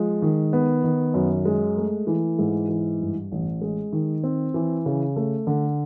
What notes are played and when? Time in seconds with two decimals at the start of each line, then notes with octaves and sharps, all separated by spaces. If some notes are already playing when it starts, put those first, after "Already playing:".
Already playing: F3 G#3
0.22 D#3
0.53 B3
0.84 D#3
1.14 F#2
1.45 G#3
1.77 A3
2.07 E3
2.39 G#2
2.69 E3
3.01 G2
3.32 A1
3.61 G#3
3.93 D#3
4.23 C4
4.54 E3
4.86 C#3
5.16 A3
5.47 D3